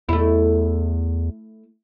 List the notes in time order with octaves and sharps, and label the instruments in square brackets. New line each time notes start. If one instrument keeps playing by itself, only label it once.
[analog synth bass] E2 [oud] A3 E4